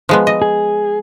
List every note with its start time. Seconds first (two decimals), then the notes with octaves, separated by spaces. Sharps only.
0.09 F3 G#3 B3
0.27 D#5
0.42 G#4